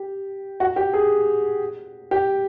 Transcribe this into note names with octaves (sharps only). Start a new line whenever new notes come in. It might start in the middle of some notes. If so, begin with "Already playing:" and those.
Already playing: G4
F#4
G4
G#4
G4